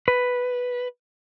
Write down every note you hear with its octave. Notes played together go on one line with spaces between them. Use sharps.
B4